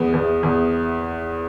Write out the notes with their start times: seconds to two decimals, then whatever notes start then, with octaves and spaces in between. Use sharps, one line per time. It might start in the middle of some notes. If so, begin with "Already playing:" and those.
Already playing: E2 B3
0.13 E2
0.43 E2